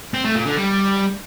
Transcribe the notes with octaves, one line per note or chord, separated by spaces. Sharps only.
C4
A3
A#2
D3
G3